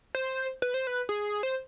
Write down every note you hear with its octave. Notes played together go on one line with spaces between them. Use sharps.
C5
B4
C5
B4
G#4
C5